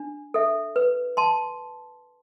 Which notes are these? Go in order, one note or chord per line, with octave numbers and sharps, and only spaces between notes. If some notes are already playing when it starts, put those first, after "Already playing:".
Already playing: D4
A4 E5
B4
A5 C6